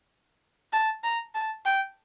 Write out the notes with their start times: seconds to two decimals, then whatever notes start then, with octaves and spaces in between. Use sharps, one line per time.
0.73 A5
1.04 A#5
1.35 A5
1.65 G5